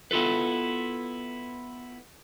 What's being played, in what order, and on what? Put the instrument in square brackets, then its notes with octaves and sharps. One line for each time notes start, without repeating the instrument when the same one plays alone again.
[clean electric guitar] B3 E4 F4 A4 B4